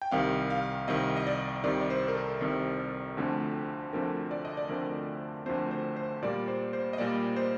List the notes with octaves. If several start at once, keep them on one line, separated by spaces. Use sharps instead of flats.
G5
C2 C3 D#3 F5
F5
C2 C3 D#3 D#5
D#5
D5
C2 C3 D#3 D5
D5
C5
A#4
A4
C2 C3 D#3
D2 D3 F3 A3 C4
D2 D3 F3 A3 C4 A#4
D5
D#5
D5
D2 D3 F3 A3 C4 A#4
D2 D3 F3 A3 C4 C5
C5
C5
A#2 G3 A#3 D5
C5
C5
D#5
A#2 G3 A#3 D5
C5